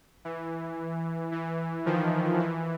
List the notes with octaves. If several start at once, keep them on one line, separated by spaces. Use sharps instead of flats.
E3
E3
D#3 F3
E3